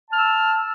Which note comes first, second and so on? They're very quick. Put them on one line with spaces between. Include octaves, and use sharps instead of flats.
A5 F6 E6